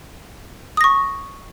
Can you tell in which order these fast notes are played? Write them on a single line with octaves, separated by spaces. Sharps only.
D#6 A#6 C#6